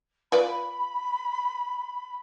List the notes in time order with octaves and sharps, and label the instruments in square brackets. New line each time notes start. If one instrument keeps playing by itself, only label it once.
[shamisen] F4 B4 D5 [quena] B5